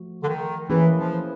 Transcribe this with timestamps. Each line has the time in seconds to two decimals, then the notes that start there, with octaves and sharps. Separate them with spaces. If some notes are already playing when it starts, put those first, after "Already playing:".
Already playing: F3 A3 F#4
0.23 D3
0.28 D#3
0.69 E3 A#3 C#4 E4 G#4 B4
0.97 F3